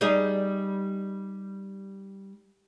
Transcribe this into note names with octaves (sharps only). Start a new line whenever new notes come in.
G3 D#4 G#4